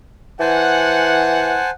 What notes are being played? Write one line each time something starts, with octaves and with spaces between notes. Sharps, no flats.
E3 C5 F#5 G#5 A5